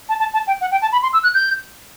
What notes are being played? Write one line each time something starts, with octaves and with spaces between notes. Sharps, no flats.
A5
A5
A5
G5
F#5
G5
A5
B5
C6
E6
F#6
G6